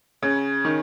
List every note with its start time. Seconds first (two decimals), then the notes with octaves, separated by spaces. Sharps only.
0.22 C#3
0.65 D#3